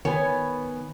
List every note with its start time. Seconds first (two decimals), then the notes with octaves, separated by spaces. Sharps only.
0.05 D#3 B3 C#5 G#5